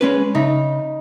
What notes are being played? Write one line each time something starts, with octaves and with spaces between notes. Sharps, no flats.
G#3 C#4 B4
C#3 D#4 E5